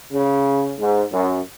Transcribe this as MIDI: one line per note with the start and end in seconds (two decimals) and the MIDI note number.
0.12 0.72 49
0.79 1.04 44
1.11 1.40 42